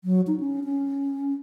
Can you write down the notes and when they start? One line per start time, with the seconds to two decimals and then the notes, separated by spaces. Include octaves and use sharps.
0.04 F#3
0.27 D#4
0.40 C#4
0.64 C#4